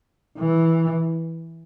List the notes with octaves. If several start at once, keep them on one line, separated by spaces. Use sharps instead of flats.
E3